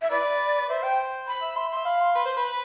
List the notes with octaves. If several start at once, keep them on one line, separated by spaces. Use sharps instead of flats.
E5
E4 B4 D5
C5 E5
G5
B5
E5
E5 C6
C6
E5
F5 B5
C6
B4 C6
C5
B4
B5